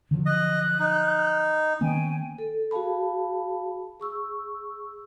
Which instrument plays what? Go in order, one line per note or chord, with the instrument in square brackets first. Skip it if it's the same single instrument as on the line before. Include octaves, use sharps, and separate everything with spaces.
[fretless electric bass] D3 F3 F#3
[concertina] D#5 [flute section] F#6
[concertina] D#4
[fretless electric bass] D#3 A#3 B3 [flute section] C#4 G5 G#5
[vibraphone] A4
F#4 G#4 F5 A5 B5
G#4 C#6 E6